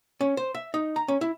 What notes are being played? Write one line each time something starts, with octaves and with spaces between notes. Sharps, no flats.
C#4
C5
E5
D#4
A#5
C#4
E4